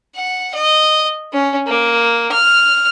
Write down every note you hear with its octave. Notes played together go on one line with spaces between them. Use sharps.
F#5
D#5
C#4
A#3
F6